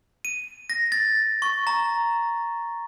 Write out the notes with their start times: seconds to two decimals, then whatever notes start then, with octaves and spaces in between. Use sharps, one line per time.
0.25 D#7
0.70 A#6
0.92 A6
1.42 C#6
1.67 A#5